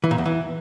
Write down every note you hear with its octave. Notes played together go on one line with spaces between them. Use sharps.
E3
A#2
E2
E3